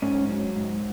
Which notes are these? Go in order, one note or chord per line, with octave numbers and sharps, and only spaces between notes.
G#2 C#4
F#3
G#2